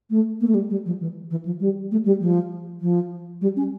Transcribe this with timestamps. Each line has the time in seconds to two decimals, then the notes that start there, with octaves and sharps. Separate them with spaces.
0.10 A3
0.41 A#3
0.47 A3
0.54 G3
0.70 G3
0.86 F3
1.00 E3
1.31 E3
1.45 F3
1.60 G3
1.91 A3
2.06 G3
2.20 F3
2.81 F3
3.41 G3
3.56 C#4